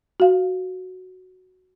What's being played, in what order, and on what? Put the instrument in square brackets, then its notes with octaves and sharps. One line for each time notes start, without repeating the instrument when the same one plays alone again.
[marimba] F#4 F5